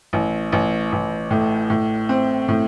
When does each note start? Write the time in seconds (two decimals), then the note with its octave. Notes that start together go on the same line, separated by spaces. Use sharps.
0.13 A1
0.52 A1
0.92 A1
1.31 A2
1.70 A2
2.09 C4
2.48 A2